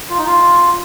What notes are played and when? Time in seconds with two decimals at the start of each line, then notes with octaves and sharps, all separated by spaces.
0.10 F4
0.18 D#4
0.26 F4